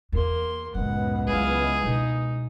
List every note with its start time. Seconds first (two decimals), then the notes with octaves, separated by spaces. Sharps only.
0.12 E2 A#3 C6
0.75 C#2 F#2 A2 G#3 B3 F#5
1.27 D#3 F#3 E4 G#4 F5
1.83 B2 D#4